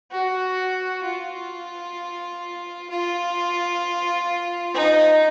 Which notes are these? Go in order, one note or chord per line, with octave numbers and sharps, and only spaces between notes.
F#4
F4
F4
D#4